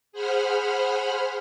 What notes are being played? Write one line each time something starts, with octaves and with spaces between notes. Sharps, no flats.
G#4 C5 F#5 B5 F6